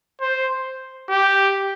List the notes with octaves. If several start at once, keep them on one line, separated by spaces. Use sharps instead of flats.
C5
G4